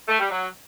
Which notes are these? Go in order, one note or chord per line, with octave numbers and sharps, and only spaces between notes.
A3
G3
F#3